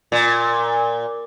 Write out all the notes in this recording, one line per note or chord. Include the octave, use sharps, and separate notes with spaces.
A#2